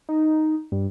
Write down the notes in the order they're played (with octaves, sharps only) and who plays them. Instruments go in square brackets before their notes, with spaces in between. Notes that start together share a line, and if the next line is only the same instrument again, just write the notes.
[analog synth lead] D#4
G2